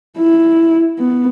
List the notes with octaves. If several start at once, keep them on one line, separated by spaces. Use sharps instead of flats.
E4
B3